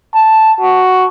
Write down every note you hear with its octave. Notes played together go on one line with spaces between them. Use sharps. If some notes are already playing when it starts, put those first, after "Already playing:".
A5
F#4